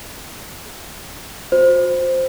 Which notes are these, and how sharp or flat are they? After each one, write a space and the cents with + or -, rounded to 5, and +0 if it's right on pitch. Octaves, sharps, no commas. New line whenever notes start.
F#4 -45 C5 +0